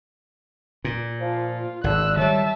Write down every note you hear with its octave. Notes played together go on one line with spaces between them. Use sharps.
A#2
F3 F4
G#1 D4 E6 F#6
D#3 G3 C#5 E5 A5